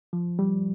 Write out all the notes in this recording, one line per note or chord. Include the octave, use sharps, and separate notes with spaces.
F3
G3